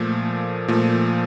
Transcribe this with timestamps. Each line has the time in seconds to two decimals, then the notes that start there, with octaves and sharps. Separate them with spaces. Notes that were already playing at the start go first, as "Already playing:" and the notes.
Already playing: A#2 F3 A3
0.68 A#2 F3 A3